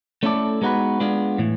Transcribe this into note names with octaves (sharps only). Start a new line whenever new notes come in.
A3 C#4 E4 A4 D5
G#3 B3 D#4 F#4 B4
G#3 B3 D4 F4
A2 E3